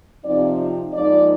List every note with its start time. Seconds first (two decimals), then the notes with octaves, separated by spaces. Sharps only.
0.24 C3 F3 C4 D#4 D5
0.94 G#2 F3 A#3 D#4 D5